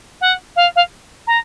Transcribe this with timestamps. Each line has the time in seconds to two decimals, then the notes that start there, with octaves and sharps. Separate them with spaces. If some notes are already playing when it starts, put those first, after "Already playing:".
0.21 F#5
0.56 F5
0.75 F5
1.27 A#5